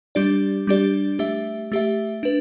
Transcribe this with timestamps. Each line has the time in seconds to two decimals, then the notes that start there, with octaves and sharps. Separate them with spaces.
0.15 G3 D4 G4 D5
0.67 G3 D4 G4 D5
1.19 A3 G4 E5
1.72 A3 G4 E5
2.23 D4 B4